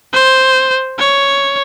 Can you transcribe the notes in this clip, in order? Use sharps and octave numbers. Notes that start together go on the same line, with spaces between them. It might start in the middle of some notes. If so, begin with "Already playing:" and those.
C5
C#5